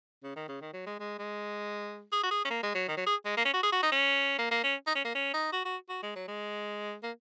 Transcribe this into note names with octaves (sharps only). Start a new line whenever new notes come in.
C#3
D#3
C#3
D#3
F#3
G#3
G#3
G#3
G#4
F#4
G#4
C#4
A#3
G#3
F#3
D#3
F#3
G#4
G#3
A#3
C#4
F#4
G#4
F#4
D#4
C#4
A#3
A#3
C#4
D#4
C#4
A#3
C#4
D#4
F#4
F#4
F#4
G#3
F#3
G#3
A#3